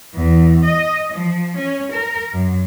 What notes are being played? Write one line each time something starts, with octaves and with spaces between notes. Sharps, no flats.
E2
D#5
F3
C#4
A#4
F#2